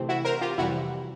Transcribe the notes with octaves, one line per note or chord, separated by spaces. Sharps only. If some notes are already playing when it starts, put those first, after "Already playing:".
Already playing: C3 E3 A3 C4
E4 F#4
A#4 C5
F4 G4
F2 C3 E3 G3 E4 F#4